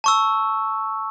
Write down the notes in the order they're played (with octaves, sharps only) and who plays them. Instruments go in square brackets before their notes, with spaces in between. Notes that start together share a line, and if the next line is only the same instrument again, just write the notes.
[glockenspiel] A5 C#6 E6